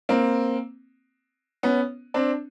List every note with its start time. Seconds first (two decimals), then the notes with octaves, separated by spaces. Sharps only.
0.09 A#3 C4
1.63 B3 C#4
2.14 C4 D4